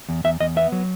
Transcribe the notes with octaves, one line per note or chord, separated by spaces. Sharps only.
E2
E2 E5
E2 D#5
B3 E5
F#3